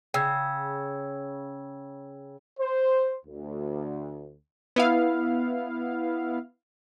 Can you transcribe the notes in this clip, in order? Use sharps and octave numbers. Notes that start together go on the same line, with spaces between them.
C#3 G5 E6 G#6
C5
D2
B3 E4 F5